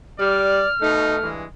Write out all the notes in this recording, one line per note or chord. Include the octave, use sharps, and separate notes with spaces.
G3 D5 F6
B2 A3 D#4
G2 E3 G#3